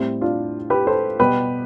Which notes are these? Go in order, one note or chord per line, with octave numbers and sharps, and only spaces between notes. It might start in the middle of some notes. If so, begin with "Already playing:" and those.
Already playing: A2 G3 C4 E4
D4 F4
G4 B4
A4 C5
B2 G3 G4 B4